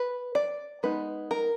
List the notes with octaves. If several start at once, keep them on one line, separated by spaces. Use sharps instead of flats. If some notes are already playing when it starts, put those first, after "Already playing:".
Already playing: B4
D5
G#3 B3 D#4 B4
A#4